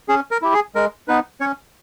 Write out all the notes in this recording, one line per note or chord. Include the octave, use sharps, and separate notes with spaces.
C#4 G#4
A#4
E4 G4
G#4
G#3 A#4
B3 D#4 B4
C#4 C#5